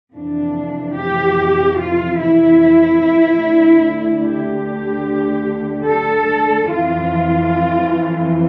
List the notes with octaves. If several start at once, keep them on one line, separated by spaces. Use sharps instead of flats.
F2 C3 E3 D4
G4
F4
E4
D2 D3
G4
A4
F2 E3 F4